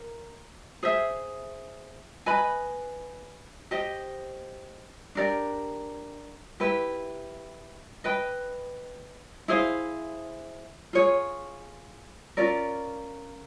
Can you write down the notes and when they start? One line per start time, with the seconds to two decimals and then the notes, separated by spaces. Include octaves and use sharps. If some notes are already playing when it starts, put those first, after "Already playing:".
Already playing: A#4
0.83 G#4 C5 E5
2.26 B4 D#5 G#5 B5
3.71 G4 C5 D#5
5.15 D4 G4 A#4 D5
6.60 E4 G4 B4
8.04 B4 D#5 G5 B5
9.48 E4 G#4 C5 F5
10.93 F4 G#4 C#5
12.37 C#4 F4 A#4 D5